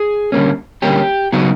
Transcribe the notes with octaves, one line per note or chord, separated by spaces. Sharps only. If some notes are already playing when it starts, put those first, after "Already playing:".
Already playing: G#4
D3 G3 A#3 C#4
D3 G3 A#3 C#4 G4
C#3 F#3 B3 D#4 F#4